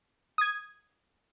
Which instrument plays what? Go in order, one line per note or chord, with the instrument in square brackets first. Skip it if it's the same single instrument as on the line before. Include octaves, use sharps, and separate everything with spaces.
[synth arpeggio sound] D#6 G#6